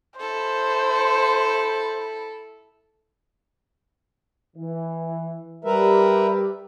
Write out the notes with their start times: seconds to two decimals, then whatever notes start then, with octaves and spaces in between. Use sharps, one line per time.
0.20 E4 A4 C5
4.56 E3
5.65 G3 G4 A#4 B4 E5